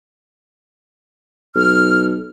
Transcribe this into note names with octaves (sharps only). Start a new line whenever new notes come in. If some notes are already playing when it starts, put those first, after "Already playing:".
B1 F6